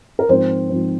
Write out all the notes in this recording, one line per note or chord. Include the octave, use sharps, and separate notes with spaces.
A#4
G#2 F3 C4 C5
G#2 F3 C4